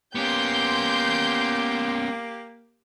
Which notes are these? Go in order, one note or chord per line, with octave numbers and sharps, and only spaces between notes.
A#3 B3 C#4 G4 C6 D6 G6